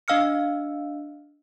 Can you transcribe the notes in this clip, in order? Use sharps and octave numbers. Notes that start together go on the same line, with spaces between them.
D4 D#5 F5 E6 F6 C#7